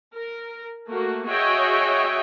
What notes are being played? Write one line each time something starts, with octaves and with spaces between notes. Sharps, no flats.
A#4
A3 A#3 F#4
F#4 G#4 C#5 D#5 E5 G5